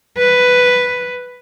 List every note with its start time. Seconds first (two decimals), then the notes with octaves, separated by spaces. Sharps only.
0.18 B4